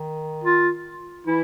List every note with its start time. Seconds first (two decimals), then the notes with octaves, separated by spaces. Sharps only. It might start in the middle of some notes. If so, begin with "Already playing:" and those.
Already playing: D#3
0.44 F4
1.27 E3 E4